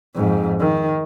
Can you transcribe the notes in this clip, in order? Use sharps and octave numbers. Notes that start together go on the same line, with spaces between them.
F2 G#2
D#3